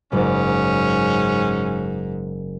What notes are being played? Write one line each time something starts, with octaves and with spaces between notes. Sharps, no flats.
F#1 G#2 C#4